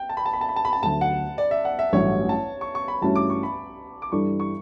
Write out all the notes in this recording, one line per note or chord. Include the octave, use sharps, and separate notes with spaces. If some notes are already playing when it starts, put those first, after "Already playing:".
Already playing: G5
A5
B5
A5
B5
A5
B5
A5
B5
A5
D2 D3 F#3 A3 A5
F#5
D5
E5
F#5
E5
A1 G2 F#3 A3 C#5
A5
C#6
C#6
B5
G2 E3 A3 C#4 F#4 A5
D6
C#6
B5
D6
G2 E3 G3 D4 A4 C#6
C#6